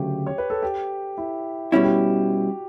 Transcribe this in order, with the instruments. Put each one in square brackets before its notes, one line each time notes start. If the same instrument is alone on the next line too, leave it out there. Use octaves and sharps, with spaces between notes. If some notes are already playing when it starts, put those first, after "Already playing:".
Already playing: [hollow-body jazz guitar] D2 C#3 F#3 A3 [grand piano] G4
[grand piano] C#5
B4
A4
G4
E4
[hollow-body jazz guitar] B2 G3 C#4 E4 [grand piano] F#4
[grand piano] G4